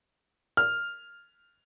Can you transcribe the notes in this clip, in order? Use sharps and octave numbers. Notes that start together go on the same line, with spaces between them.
F6